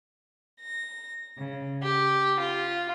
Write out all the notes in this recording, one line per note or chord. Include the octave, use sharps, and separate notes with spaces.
A#6
C#3
G4
F4